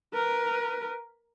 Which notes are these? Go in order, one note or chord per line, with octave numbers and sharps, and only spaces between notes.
A#4 B4